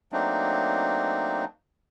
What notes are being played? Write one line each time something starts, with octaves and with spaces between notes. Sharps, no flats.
F#3 A3 A#3 C4 D4 D#4